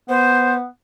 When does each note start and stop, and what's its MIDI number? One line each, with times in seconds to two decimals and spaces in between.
0.09 0.65 59
0.09 0.54 72